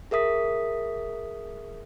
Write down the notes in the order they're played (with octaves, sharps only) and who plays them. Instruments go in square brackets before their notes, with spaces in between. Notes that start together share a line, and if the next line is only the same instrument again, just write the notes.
[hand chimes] G#4 A#4 E5 D#6 B6